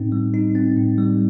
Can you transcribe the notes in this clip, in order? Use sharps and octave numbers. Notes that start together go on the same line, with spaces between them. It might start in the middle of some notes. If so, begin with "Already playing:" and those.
Already playing: A2 C4 D#4
G3
D#4
C4
A2
G3